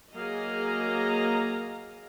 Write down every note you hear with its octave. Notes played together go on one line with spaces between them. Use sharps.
F#3 A#3 G#4 D#5 F5 A#5